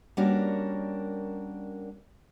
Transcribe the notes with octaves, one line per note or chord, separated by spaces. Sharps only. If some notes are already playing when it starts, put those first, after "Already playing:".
G3 A#3 C#4 D4 F#4 A#4